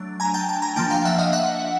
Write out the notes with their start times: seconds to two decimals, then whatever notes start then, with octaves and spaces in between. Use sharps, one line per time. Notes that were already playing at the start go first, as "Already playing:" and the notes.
Already playing: F#3 A3 D4
0.20 G#5 A#5
0.34 G5 A5
0.49 G5 A5
0.62 G#5 A#5
0.76 F3 A#3 D4 G5 A5
0.90 F5 G5
1.05 E5 F#5
1.19 D#5 F5
1.33 E5 F#5